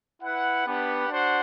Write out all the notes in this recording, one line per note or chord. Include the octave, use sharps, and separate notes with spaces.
E4 B4 F#5
B3 D4 G4 B4 F#5
D4 F#4 C5 F#5